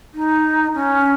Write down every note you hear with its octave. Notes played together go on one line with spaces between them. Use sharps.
D#4
C#4